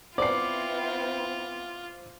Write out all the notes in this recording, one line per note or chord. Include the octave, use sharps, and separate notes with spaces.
B3 C4 E4 F4 C5 D5 C7